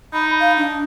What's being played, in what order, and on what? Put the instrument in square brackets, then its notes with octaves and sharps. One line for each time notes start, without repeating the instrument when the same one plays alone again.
[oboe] D#4 [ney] B5
[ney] F5
D4